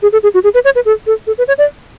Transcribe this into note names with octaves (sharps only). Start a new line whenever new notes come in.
G#4
A4
G#4
F#4
G#4
B4
C#5
B4
A4
A4
A4
B4
C#5
D5